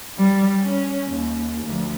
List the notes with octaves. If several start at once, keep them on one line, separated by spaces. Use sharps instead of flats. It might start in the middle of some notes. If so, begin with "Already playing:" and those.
G3
C#4
D#2
D2 F3